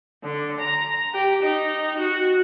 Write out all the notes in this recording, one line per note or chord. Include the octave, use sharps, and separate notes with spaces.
D3
A#5
G4
D#4
F#4